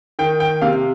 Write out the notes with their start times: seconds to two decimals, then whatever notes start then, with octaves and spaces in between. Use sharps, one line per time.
0.19 D#3 G5
0.40 G5
0.62 C3 F5